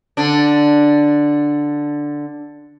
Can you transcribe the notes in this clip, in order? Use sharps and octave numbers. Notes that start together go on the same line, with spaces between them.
D3 D4